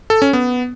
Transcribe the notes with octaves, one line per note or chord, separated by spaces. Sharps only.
A4
C#4
B3